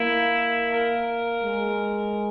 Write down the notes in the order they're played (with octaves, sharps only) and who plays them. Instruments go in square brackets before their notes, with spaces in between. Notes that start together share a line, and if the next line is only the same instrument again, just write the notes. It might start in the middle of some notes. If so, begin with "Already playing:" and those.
Already playing: [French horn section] A#3 [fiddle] E4
[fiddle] A#4
[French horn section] G#3